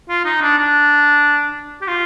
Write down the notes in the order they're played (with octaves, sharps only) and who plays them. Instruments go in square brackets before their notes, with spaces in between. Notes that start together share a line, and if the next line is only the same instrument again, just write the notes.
[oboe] F4
D#4
D4
D4
G4
F4